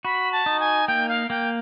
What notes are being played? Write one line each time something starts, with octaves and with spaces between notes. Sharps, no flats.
F#4 B5
A5
D#4
G#5
A#3 G5
F5
A#3 G5